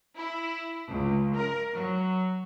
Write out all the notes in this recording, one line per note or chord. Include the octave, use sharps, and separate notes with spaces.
E4
C#2
A#4
F#3